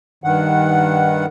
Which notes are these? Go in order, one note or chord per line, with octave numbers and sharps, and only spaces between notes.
G2 D#3 F#5